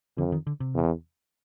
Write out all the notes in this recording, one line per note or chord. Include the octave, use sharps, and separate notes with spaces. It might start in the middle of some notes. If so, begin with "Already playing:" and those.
F2 D3
D#3
D3
C3
E2